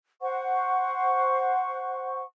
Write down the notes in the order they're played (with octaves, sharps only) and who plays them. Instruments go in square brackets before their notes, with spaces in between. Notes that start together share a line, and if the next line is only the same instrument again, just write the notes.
[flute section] C5 F#5 C#6